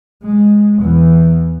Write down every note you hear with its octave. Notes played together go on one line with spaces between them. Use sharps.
G#3
E2 E3